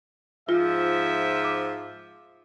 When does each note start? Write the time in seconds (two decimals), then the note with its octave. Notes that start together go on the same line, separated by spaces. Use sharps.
0.49 G#2 F3 F4 E5
1.44 D6